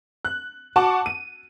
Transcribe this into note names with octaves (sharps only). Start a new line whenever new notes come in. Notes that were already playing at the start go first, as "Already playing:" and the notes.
F#6
F#4 F#5 A5 C#6 D6
D#7